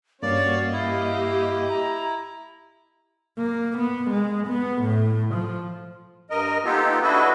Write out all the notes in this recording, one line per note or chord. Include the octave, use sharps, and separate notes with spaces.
G2 A#3 C#4 F#4 C#5 D5 F5
E4 G4 D#5
A#5
A#3
B3
G#3
B3
A2
F3
G2 A#4 D#5
A#3 B3 D#4 F4 G4 A4
D4 E4 F#4 A4 B4 D#5